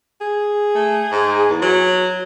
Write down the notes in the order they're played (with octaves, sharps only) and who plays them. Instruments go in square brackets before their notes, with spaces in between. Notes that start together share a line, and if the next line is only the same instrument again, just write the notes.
[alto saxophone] G#4
[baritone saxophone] A3
G#2
E2
F#3